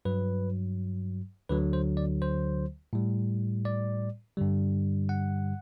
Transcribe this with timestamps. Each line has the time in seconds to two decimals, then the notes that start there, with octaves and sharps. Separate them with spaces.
0.05 G2 F#3 B4
1.49 D2 D3 F#3 B4
1.73 C5
1.97 D5
2.22 C5
2.93 A2 G3
3.65 D5
4.37 G2 D3 G3
5.09 F#5